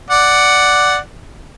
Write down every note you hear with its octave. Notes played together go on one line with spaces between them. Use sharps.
D5 F#5